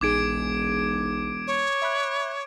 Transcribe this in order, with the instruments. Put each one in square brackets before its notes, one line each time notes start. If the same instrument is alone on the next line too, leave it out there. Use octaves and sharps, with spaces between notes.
[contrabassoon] E1 [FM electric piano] A#1 D#4 G#4 [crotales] D6 G#6 D7
[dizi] C#5
[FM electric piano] E5 B5 F#6